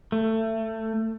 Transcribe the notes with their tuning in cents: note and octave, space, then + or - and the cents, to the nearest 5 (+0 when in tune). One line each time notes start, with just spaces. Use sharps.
A3 +20